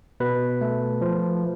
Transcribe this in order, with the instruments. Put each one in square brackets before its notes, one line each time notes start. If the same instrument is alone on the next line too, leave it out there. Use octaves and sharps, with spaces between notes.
[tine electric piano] B2 B4
A3
F3